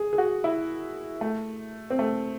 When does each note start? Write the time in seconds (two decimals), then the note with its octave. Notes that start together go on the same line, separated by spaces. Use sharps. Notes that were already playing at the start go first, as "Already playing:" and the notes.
Already playing: G#4
0.13 G#4
0.18 F#4
0.44 E4
1.21 A3
1.90 C4
1.99 A3